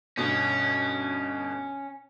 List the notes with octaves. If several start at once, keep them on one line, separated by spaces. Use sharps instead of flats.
G1 B2 C#4